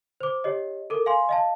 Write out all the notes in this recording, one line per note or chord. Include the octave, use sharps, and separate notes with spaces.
C5 D6
G4 C#5 D#5
A4 A#4 D6
F5 G#5 C6
D#5 F5 A5